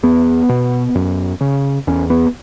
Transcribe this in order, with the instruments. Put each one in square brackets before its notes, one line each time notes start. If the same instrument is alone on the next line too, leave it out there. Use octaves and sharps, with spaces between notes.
[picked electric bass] E2 B3
B2
F#2
C#3
E2 C#4
B3